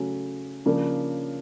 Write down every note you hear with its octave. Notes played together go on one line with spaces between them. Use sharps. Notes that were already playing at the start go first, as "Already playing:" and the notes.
Already playing: C#3 F#3 A3 C#4
C#3 F3 A#3 D4